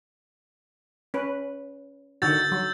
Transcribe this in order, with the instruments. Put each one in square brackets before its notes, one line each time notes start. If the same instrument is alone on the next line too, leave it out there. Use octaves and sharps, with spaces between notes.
[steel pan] C#4 B4
[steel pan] D3 D#3 F#4 [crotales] E6 G6 A6
[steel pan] F#3